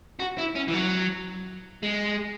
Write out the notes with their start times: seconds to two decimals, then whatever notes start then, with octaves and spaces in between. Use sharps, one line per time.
0.20 F#4
0.38 E4
0.55 C#4
0.68 E3
0.73 F#3
1.83 G#3